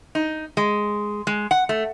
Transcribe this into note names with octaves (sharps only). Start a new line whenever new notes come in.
D#4
G#3
G#3
F#5
A3